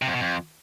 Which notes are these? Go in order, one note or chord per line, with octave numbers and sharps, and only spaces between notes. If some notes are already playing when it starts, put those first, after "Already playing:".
C3
F2
B2
F2